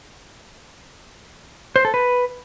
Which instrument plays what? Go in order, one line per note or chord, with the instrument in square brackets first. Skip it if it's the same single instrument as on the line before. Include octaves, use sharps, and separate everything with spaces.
[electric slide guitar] C5
A4
B4